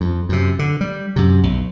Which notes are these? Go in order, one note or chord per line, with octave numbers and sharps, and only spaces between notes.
F2
F#2 C3
D3
G3
F#2 C3
B1